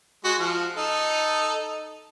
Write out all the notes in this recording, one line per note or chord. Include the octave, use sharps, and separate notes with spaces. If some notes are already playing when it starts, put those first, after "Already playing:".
G#3 F#4
F3
D#4 A4